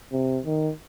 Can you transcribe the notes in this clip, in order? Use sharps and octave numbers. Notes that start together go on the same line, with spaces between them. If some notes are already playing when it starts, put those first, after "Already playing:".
C3
D#3